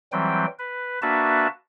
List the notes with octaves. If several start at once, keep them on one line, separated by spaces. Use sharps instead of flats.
E3 F#3 G3 C4 G5
B4
A#3 D4 F#4 B4 E5 A5